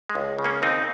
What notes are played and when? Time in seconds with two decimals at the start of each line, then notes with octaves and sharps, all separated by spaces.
0.09 G#3
0.15 C#2
0.38 C#3
0.44 A#3 C#4
0.62 D#2 C4 D#4